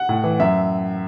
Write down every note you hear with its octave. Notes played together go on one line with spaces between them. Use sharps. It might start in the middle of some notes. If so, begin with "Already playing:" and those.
Already playing: F#5
A2
E3
F#2 E5